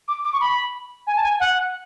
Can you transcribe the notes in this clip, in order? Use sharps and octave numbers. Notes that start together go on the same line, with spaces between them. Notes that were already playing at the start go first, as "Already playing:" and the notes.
D6
D6
C#6
B5
G#5
A5
G#5
F#5